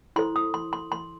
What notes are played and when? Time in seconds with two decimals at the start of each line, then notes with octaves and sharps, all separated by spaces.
0.16 E4 A4 C5 C6
0.36 D#6
0.54 C6
0.73 C6
0.92 C6